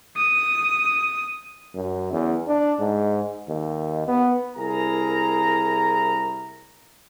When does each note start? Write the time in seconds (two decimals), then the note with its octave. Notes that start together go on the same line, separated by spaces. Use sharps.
0.16 D#6
1.74 F#2
2.12 E2
2.47 D4
2.79 G#2
3.48 D#2
4.07 B3
4.56 C2 E4 G#4 A#4 A#5